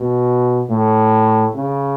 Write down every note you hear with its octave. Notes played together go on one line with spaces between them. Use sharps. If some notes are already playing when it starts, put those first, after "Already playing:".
Already playing: B2
A2
C#3